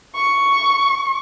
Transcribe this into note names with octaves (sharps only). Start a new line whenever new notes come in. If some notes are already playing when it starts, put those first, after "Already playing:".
C#6